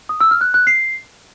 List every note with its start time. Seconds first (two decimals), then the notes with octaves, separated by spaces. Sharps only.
0.09 D#6
0.20 E6
0.31 F6
0.41 F#6
0.54 F#6
0.67 C7